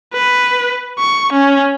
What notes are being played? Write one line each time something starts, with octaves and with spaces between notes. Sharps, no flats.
B4
C#6
C#4